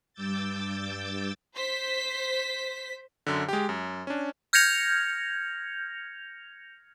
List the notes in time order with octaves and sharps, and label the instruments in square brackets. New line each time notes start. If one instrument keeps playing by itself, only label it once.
[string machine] G2 D6 E6 G6 A6
[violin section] C5 B6
[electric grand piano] F#2 D3
G#3 G4
F#2
C#4 D4
[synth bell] F6 G6 G#6 A#6 C#7 F7